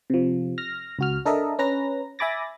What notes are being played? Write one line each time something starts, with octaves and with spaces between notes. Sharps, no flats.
C3 F3
F6 A#6
C#2 F#4 F6
D4 A4 A#4 D#5 E5
C#4 B4 A#5 A#6
E5 G#5 B5 D6 A6 A#6